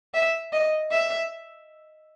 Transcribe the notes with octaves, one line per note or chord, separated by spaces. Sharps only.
E5
D#5
E5